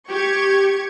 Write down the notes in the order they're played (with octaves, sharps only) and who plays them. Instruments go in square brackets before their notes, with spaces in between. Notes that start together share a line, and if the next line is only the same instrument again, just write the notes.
[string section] G4 C#6 G#6